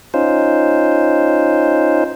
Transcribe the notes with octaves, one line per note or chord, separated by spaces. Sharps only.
C#4 D#4 F4 C5